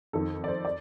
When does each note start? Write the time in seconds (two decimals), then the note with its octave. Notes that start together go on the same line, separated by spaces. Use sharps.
0.13 F2 D#3 A4
0.44 D5
0.48 C5
0.65 D5